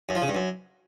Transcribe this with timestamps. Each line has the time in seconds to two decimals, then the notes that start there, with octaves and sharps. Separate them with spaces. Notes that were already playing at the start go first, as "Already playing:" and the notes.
0.09 F#2
0.15 F3
0.22 C#3
0.28 G2
0.35 F#2